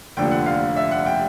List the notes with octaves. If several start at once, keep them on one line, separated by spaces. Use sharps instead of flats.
F1 D#2 D3 F3 G5
F#5
F5
E5
F#5
G5